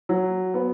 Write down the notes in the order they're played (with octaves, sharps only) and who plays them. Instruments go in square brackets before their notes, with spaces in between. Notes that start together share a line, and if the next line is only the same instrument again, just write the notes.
[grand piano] F#3
B3